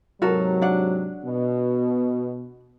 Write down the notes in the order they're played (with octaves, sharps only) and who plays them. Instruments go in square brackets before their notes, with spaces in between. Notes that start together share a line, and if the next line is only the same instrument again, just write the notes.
[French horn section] G#2 C3 F#3 [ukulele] F#4 A4 A#4
[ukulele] D4 F#5
[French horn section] B2